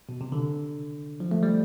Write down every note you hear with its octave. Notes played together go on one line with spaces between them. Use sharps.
B2
C3
D3
F3
A3
G3